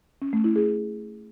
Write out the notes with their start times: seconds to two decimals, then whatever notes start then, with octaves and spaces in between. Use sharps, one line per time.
0.22 C#4
0.33 A3
0.44 E4
0.56 G#4